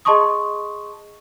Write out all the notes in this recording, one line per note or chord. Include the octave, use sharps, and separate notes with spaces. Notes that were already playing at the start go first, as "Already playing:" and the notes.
G#4 D#5 A5 C6 C#6 D#6